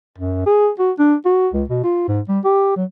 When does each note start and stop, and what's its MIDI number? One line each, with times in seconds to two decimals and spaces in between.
0.18 0.42 42
0.46 0.69 68
0.79 0.92 66
0.99 1.15 62
1.25 1.48 66
1.54 1.64 37
1.69 1.82 47
1.84 2.05 65
2.08 2.20 44
2.28 2.39 55
2.44 2.74 67
2.76 2.85 54